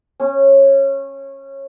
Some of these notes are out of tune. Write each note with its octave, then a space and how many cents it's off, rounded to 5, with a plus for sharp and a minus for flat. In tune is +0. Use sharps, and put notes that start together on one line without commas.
C#4 -20